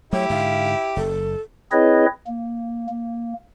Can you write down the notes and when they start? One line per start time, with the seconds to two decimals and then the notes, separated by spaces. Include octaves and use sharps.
0.13 F#3 A3 E4 G4 C#5
0.30 G#2 D3 F5
0.96 F#1 A4
1.72 C4 E4 G#4 B4 C#5 D#5
2.27 A#3
2.89 A#3